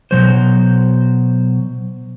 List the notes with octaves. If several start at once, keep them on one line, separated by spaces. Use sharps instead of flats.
B2 F#3 C5